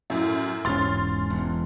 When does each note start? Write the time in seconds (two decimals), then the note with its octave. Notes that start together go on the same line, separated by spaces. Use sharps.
0.10 F#2 A2
0.65 E1 G#2 C#4 C6 F6 A6
1.30 E1